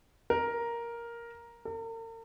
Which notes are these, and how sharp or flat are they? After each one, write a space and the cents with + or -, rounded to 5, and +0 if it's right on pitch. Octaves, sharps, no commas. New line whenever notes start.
A#4 +5
A#4 -45